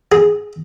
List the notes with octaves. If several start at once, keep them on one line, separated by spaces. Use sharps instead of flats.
G#4